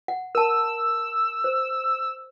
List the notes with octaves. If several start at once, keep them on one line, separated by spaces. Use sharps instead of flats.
F#5
A#4 A5 E6
C5